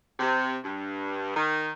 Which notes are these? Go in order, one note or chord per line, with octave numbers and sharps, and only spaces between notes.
C3
G2
D#3